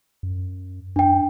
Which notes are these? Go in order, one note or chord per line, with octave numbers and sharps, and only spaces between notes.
F#2
F#2 D4 G5